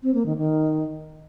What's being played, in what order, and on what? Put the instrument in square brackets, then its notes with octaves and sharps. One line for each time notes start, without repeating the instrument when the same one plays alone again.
[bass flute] C4
A#3
D#3
D#3